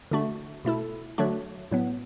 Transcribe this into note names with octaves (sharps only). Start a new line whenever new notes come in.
D3 A3 D4 F#4
B2 A3 E4 A4
D3 F#3 A3 D4 F#4
A2 F#3 B3